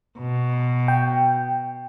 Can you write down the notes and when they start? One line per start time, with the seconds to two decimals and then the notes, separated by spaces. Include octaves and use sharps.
0.19 B2
0.88 G5